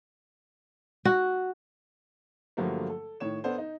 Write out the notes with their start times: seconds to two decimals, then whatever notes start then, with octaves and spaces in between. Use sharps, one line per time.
1.05 F#4
2.57 G2 D3 F3 F#3 A3 A#3
2.90 A4
3.20 A2 D#3 C#5 E7
3.44 B3 D4 A4 C5
3.58 D#4